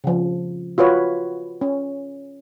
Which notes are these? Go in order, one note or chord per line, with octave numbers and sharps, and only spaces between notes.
C#3 F3
F4 F#4 B4 C#5
C#4